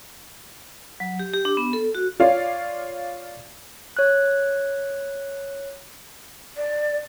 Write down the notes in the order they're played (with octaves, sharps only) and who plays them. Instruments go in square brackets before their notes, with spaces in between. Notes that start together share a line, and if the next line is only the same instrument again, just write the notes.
[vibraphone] F#3
G4
G4
D4
B3
A4
F#4
[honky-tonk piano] F4 C#5 D5 F5
[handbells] C#5 F#6
[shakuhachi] D5